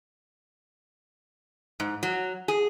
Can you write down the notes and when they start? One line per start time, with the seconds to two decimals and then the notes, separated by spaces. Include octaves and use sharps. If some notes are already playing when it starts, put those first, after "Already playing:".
1.80 G#2
2.03 F#3
2.48 G#4